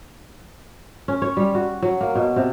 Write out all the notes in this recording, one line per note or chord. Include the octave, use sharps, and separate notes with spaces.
C#4
C#5
G3
F#4
F#3
A#3
B2
C3